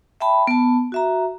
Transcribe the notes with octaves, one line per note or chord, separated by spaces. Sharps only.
E5 G5 A5 B5
B3 A5
F#4 E5 A#5